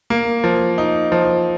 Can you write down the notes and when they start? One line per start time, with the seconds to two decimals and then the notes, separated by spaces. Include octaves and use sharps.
0.10 A#3
0.44 F3
0.78 D#4
1.12 F3